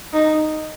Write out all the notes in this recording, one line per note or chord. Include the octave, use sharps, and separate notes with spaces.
D#4